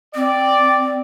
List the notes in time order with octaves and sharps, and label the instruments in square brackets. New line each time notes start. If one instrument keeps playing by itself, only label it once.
[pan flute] C4 [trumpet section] D5